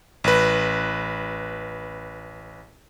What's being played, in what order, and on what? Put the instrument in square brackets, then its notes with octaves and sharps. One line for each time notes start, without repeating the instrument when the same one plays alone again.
[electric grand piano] A1 B4